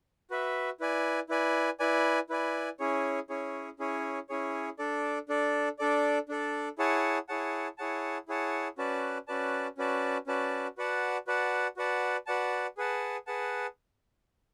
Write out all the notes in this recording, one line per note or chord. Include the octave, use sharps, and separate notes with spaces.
F#4 B4 E5
E4 B4 D5 G#5
E4 B4 D5 G#5
E4 B4 D5 G#5
E4 B4 D5 G#5
C#4 E4 G#4 C#5
C#4 E4 G#4 C#5
C#4 E4 G#4 C#5
C#4 E4 G#4 C#5
D4 A4 D5
D4 A4 D5
D4 A4 D5
D4 A4 D5
E4 G#4 C#5 F#5 A5
E4 G#4 C#5 F#5 A5
E4 G#4 C#5 F#5 A5
E4 G#4 C#5 F#5 A5
C#4 F#4 B4 D5 A5
C#4 F#4 B4 D5 A5
C#4 F#4 B4 D5 A5
C#4 F#4 B4 D5 A5
F#4 B4 D5 F#5 A5
F#4 B4 D5 F#5 A5
F#4 B4 D5 F#5 A5
F#4 B4 D5 F#5 A5
G#4 B4 F#5 A5
G#4 B4 F#5 A5